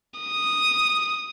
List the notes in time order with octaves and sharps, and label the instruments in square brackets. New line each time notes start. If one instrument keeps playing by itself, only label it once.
[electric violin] D#6